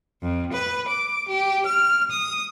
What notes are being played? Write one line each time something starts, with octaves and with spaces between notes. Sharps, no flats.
F2
B4
D6
G4
F6
D#6